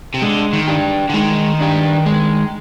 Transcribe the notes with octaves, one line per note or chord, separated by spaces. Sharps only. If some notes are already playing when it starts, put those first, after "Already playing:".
C3
D3 G#3
D#3
D4 G4
D3
D#3 G#3
D4 G4
G#3